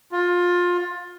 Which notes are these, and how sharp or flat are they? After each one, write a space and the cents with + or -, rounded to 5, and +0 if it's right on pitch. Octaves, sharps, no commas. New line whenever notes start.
F4 +20